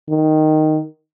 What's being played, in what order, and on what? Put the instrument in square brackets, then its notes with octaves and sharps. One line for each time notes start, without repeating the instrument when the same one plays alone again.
[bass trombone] D#3